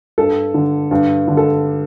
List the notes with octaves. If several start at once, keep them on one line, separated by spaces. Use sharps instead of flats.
G2 A4
D3
G2
D3
A4